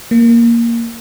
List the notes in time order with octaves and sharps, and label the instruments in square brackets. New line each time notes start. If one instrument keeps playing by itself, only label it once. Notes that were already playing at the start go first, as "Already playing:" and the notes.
[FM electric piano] A#3